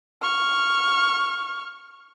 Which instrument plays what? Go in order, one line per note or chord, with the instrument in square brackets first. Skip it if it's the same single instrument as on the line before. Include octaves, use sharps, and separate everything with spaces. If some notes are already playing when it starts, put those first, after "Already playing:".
[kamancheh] C#6 F6